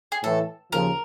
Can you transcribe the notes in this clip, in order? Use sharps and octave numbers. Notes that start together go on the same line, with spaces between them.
G#4
A2 E3 A3 A4
D#2 C#3 F3 A#4